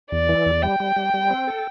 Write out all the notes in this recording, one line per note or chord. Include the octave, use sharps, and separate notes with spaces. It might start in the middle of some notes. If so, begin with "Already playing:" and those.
E2 D5
E3
E2
G3 G5
G3
G3
G3
C4
A4